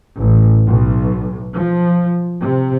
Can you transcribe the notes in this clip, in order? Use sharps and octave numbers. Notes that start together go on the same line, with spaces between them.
A1
B1
F3
C3